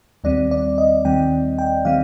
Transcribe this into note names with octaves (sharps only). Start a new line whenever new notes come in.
D#2 D#3 G3 C4 D5
D5
D#5
D#2 D#3 G3 C4 G5
G5
D#3 G3 C4 F5